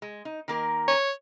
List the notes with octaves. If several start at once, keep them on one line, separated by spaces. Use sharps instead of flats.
G#3
D#4
D#3 A#3 A#4
C#5